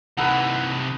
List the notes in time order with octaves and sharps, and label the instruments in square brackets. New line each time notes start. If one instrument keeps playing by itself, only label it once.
[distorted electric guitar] C3 E3 [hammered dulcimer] D#4 A4 B4 [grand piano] F#5